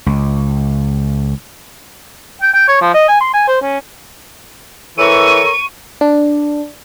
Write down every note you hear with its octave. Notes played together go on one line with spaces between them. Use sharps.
C#2
G5
G5
C#5
F3
D#5
G#5
C6
G#5
C5
C#4
E3 A4 A#4 C#5 C#6 D#7
D4